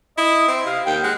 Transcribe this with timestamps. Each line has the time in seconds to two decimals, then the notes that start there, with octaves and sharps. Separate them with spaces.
0.18 E4 D#5
0.48 C4
0.66 C3 F5
0.86 D#2 G5
1.04 G#3 F#5